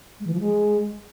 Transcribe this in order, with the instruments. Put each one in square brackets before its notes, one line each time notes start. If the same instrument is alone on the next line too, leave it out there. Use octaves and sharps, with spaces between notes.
[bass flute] G#3
E3
F3
G#3